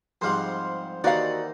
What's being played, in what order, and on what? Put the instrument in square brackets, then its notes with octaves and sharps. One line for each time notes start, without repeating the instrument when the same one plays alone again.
[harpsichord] F2 G#2 G3 [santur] C5 F5 F#5
[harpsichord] D#2 E3 [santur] D#4 [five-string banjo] F#4 F5 [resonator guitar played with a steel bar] D5 F#5